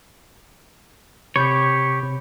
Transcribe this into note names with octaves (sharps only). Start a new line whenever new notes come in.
C3 G4 C#5 B5 G6
C3